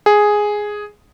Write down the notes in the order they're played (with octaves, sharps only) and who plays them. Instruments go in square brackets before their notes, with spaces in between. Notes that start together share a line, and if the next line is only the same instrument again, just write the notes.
[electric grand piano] G#4